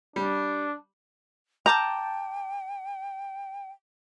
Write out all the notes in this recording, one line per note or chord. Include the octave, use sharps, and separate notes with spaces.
G3 D4
G5 A5 A#5 D6 G6